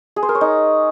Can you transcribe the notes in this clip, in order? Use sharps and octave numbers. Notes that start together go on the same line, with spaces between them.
G#4
C5
A#4
C#5
D#4